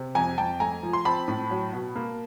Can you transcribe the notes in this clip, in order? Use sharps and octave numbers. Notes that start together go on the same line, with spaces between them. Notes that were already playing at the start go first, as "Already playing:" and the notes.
Already playing: C3
F2 G#5 A#5
F2 G5 A5
A3 G#5 A#5
F3
C6
C4 A5 B5
A2
F#3
B2
A#3